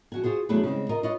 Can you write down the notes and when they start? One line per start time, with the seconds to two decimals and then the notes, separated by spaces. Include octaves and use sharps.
0.12 F2 F#4 G#5
0.23 F4 F#4 G#4 C5
0.49 E2 F#3 A3 D4 G#4 B4
0.63 C#3 G3 G#3 C4
0.89 F4 A#4 D#5
1.03 F4 B4 C#5 D#5